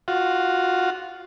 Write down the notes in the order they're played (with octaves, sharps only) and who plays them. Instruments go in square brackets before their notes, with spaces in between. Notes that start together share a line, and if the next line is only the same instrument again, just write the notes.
[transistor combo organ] F4 F#4